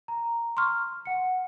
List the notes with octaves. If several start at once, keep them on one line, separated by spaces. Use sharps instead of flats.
A#5
C6 C#6 F6
F#5 C#7